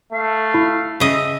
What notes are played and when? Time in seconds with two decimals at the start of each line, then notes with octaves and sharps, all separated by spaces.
0.12 A3 F5
0.54 E4
1.00 C#3 D#5 E5